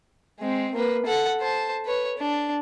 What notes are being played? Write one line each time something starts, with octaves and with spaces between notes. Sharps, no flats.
G#3 C4
A#3 B4
A4 F#5
C5 A5
B4 C#5
D4